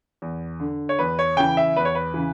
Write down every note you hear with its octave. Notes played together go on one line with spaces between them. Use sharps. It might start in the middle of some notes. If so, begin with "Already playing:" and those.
E2
D3
C#5
E2 B4
C#5
C#3 E3 G5
E5
E2 B4
C#5
B4
C#3 E3